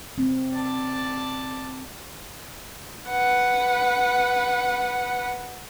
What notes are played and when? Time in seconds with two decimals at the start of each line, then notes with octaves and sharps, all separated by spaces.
0.18 C4
0.54 D5 A5
3.10 B4 F#5